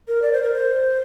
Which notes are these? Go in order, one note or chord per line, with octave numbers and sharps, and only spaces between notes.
A#4
D5
C5
A#4
C5